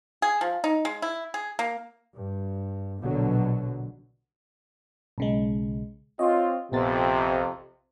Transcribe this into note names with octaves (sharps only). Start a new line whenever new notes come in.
G#4
F3
D#4
G#3
E4
G#4
A#3
G2
A#1 B2 D3 F#3
B1 C#3 G#3
C4 F4 C#5 D#5
A#1 F2 C3 B3 A6